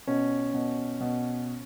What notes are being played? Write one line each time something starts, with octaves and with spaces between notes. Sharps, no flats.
B2 C#4
B2
B2